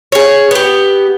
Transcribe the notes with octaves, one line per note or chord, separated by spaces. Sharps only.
G#4 C#5
B3 G4